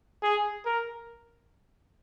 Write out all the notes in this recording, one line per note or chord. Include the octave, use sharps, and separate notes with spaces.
G#4
A#4